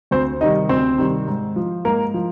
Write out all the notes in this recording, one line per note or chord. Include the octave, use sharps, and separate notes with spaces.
D2 C4 C5
C3 D#3 G3 D#4 D#5
D2 C4 C5
C3 D#3 G3
G#2
F3
G#2 A#3 A#4
F3